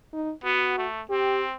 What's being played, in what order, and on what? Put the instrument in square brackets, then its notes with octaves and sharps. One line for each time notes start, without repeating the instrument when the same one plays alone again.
[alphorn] D#4
[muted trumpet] B3 [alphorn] F#4
[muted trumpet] A3
[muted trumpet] C4 [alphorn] G4